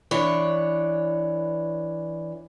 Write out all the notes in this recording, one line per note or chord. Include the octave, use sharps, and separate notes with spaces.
E3 D4 C#5